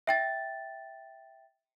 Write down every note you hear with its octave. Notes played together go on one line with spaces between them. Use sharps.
E5 G5 A6